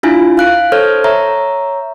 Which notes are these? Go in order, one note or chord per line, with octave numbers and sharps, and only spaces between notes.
D4 E4 F4 G#5
F5 F#6 D7
A4 C5 C#5 F6 G6 G#6
C#5 E5 A#5